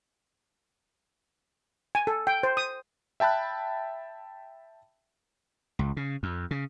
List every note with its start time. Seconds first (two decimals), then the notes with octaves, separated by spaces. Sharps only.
1.95 G#5
2.07 A4
2.27 G5
2.43 C5
2.57 D#6
3.20 E5 G5 A5 B5 F#6
5.79 C#2
5.97 C#3
6.23 F2
6.51 C#3